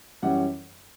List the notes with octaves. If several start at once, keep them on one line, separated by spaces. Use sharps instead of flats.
F#2 E3 G3 C#4 F#5